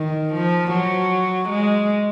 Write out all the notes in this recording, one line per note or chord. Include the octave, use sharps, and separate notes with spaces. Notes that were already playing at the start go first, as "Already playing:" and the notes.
Already playing: D#3
F3
F#3
G#3